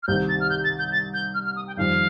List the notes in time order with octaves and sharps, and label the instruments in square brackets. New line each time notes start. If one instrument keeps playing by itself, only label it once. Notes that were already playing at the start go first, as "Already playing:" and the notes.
[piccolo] F6
[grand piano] C2 C3 D#3 [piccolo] G6
[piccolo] A6
F6
G6
A6
G6
A6
G6
F6
F6
D#6
G5
[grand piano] F2 D#3 G3 [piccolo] F5